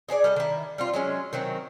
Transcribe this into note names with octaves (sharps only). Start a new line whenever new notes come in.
D#4 G#4 B4 D5
G3 A4 D#5
D#3 E4
G3 C4 F4
F#3 G#3 C#4
D#3 F#3 C4